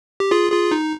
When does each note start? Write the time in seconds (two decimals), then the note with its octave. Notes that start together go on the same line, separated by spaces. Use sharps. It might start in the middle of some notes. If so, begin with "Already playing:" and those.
0.20 G4
0.31 F4 G#4
0.51 F4 G#4
0.71 D#4